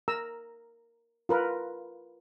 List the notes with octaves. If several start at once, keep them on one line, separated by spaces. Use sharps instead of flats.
A#4 A#5 E6
F4 A#4 B4